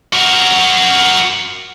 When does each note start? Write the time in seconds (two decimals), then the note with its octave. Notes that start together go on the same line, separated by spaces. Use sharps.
0.13 F#4 A#4